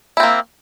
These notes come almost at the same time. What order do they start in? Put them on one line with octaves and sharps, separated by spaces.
E4 C4 A#3